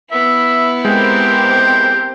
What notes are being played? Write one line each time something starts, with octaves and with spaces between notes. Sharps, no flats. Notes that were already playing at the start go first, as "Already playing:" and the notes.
B3 E4 E5
G#3 C4 G4 A#4 C5